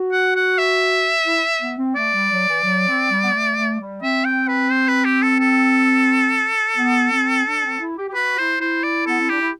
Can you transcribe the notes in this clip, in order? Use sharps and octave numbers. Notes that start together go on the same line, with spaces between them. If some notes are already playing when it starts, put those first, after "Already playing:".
Already playing: F#4
F#5
F#5
E5
E4
B3
C4
A3 D5
G3
F#3
E3
F#3
C4
G3
B3
A3
A3
G3
C4 E5
G5
B4
C5
B4
G4
A4
A4
B3
C4
D4
C4
E4
G4
G4
F#4 B4
E4 C5
E4 C5
D5
B3 A4
C4
D4 G4
E4